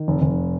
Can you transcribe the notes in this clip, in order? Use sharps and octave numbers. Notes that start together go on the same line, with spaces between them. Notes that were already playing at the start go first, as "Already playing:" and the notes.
Already playing: D#3
F1
F1